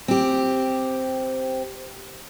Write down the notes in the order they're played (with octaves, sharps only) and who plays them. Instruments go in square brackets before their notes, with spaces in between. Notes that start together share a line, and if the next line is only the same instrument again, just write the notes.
[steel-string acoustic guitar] C4 G4